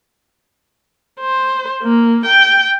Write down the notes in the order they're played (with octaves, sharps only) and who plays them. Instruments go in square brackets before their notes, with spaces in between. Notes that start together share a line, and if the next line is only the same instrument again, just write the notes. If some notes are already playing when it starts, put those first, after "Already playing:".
[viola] C5
A#3
G5